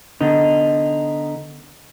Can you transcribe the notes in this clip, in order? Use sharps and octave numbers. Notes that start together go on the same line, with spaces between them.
D3 B3 D#4